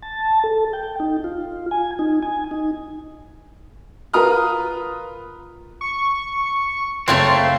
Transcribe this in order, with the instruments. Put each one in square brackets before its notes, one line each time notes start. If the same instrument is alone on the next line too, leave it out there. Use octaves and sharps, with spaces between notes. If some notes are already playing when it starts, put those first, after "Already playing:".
[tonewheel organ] A5
A4
G5
D#4
F4
G#5
D#4
G#5
D#4
[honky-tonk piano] F4 A#4 B4 A#5 D#6 F6
[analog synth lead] C#6
[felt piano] F#1 A6 [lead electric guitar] A3 C4 [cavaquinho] C#5 F5 C#6 [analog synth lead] C6